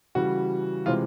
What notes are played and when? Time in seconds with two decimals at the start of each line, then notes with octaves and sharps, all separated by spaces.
0.15 C#3 E3 G3 F#4
0.86 C3 E3 G#3 C4 F4